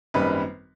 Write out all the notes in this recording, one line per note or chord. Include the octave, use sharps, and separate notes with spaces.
G#1 F#2 D#3 G3 A#3 B4